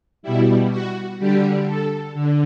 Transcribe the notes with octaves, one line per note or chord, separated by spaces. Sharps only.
B2 G3 E4
F#4
D3 G3 G4
A4
D3